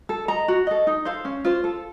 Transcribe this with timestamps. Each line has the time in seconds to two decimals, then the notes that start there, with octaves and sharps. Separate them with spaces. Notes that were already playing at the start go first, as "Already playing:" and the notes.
0.09 A4
0.28 D#5 A#5
0.48 F#4
0.67 A4 D#5
0.87 D#4
1.05 A4 C5 F5
1.25 C#4
1.45 F4 C5
1.64 A4